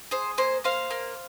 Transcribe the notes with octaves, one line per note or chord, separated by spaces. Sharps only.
G#4 C5
A#3 C5
A#3 C5 F5
A#3